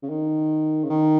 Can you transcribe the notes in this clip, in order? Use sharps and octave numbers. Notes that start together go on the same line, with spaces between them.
C#3
D#3
C#3
D#3